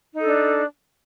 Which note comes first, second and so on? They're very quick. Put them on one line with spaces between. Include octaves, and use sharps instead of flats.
D#4 A4 D4